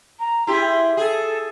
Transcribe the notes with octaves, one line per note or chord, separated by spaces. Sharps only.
A#5
E4 G4 G#4 C6
G#4 A4